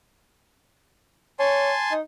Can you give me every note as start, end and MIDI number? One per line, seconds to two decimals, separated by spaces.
1.39 1.72 73
1.39 1.93 80
1.39 1.93 81
1.39 1.93 84
1.92 2.01 63